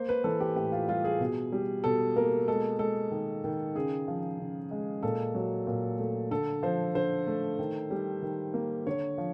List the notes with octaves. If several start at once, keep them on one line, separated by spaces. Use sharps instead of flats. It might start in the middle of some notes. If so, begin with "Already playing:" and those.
Already playing: A#3 C5
B4
E3 A4
G4
A2 G4
F4
G3 F4
G#4
B2
G3
B2 A4
A#3 A#4
G#3 A4
G#3 A4
D#3
D#3
C#3 G#4
F3
C#3
G#3
A#2 A4
F#3
A#2
A3
D3 A4
F3 C5
D3 C5
A3
D#3
G3
D#3
A#3
D3 C#5
F3